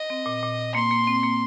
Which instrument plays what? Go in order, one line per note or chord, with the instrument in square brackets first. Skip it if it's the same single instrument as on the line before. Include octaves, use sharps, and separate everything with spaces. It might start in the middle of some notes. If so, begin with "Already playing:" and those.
Already playing: [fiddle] D#5
[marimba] C4
A#2
A#2
[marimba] A#3 [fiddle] C6
[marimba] A#3
C4
A#3